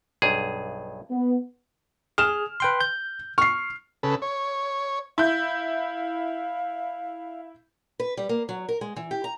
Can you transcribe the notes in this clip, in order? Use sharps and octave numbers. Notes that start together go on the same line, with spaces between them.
B1 G2 G#4
B3
G#4 F6 E7
B4 G5 C6
G6
C#6 F6 C7
C#3 A4 B4
C#5
E4 F5 G6
B4
G3
A#3
F#3
A#4
G#3
E3
G4
A#5